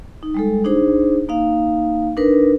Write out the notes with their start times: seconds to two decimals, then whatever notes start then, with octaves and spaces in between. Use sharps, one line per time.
0.23 D#4
0.34 G3 G#3 A4
0.64 D4 D#4 G#4 C5
1.29 A#3 D#4 F5
2.17 D4 D#4 A#4 B4